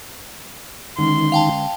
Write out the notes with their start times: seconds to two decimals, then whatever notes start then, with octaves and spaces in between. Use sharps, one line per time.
0.98 D3 D#3 G#3 C#4 D#4 C6
1.32 F5 G5 A5